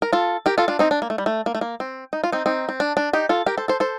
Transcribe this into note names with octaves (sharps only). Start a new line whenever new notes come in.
A#4
F4 A4
G4 A#4
F4 A4
D4 F4
C4 D#4
D4
A#3
A3
G3
A3
A#3
A3
A#3
C4
D#4
F4
C4 D#4
C4 D#4
C4
D4
D4
D#4 G4
F4 A4
G4 A#4
A4 C5
A4 C5
A4 C5